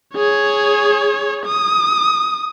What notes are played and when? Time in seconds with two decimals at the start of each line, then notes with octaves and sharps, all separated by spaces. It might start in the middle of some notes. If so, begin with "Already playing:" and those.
0.15 G#4 C#5
1.46 D#6